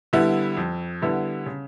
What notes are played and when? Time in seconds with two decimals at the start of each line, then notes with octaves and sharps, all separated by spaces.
0.13 D3 G3 B3 E4
0.57 F2
1.02 D3 G3 B3 E4
1.46 C#3